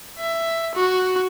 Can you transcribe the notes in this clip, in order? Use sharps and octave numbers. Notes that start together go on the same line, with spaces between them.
E5
F#4